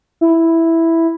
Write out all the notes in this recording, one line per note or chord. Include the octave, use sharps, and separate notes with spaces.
E4